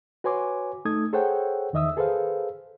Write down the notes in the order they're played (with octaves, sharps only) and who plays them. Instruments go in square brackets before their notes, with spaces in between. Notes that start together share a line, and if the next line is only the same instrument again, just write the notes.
[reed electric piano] F#4 B4 C#5 G#5 C6 D6
A3 D#4 A4 D#6 G#6
G#4 A4 C5 C#5 F#5 G5
E2 D#3 D#5 E5 D#6 E6
G#4 A4 B4 C5 F5